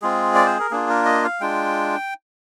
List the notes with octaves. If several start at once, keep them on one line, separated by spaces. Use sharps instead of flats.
G#3 C4 F4 G#4
D5
C5
A#4
A#3 D4 F4 G#4
A#4
D#5
F5
G#3 D4 F4 G5